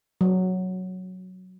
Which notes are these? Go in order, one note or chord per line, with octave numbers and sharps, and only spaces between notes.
F#3